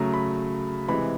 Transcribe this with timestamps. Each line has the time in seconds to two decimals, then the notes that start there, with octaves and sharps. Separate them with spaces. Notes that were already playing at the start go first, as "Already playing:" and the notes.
Already playing: C#3 F#3 A3 A#5
0.14 B5
0.88 C3 E3 G#3 B5